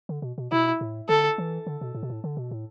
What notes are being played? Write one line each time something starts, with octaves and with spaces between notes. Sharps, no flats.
D3
B2
B2
B2 E4
A2
D3 A4
E3
D3
B2
A2
B2
A2
D3
B2
A2